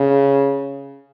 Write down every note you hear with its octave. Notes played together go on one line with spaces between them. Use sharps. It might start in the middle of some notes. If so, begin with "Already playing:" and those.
Already playing: C#3